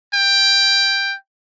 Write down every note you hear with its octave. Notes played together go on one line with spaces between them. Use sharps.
G5